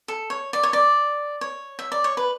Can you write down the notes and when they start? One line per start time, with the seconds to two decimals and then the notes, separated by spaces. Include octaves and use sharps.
0.08 A4
0.30 C#5
0.53 D5
0.63 C#5
0.73 D5
1.41 C#5
1.79 E5
1.92 D5
2.04 C#5
2.17 B4